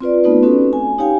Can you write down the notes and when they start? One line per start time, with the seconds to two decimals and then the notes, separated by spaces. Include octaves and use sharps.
0.01 C4 F4 B4 D5
0.24 A3 B3 D#4 F4 B4
0.43 C4 C#4 F#4 A4 B4
0.73 G#5
0.98 D#4 G4 C#5 F5 G5 G#5